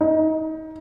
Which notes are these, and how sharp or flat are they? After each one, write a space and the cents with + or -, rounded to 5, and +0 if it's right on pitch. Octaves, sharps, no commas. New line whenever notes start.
D#4 +25